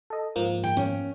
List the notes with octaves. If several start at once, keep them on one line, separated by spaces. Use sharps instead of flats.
A4 D#5
G#2 F3 A#3
G5
C#4